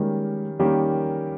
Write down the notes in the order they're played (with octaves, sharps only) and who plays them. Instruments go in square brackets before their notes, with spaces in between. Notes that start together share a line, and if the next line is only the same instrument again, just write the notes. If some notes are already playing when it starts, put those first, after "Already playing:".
Already playing: [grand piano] D#3 G3 A#3 C#4 G4 [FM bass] G#3
[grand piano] D#3 G3 A#3 C#4 G4